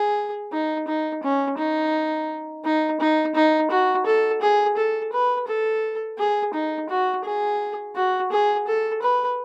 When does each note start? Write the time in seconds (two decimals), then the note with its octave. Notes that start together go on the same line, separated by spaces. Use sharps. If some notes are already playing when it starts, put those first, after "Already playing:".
Already playing: G#4
0.52 D#4
0.87 D#4
1.23 C#4
1.58 D#4
2.65 D#4
3.00 D#4
3.35 D#4
3.71 F#4
4.06 A4
4.41 G#4
4.77 A4
5.13 B4
5.48 A4
6.19 G#4
6.53 D#4
6.89 F#4
7.25 G#4
7.96 F#4
8.32 G#4
8.67 A4
9.02 B4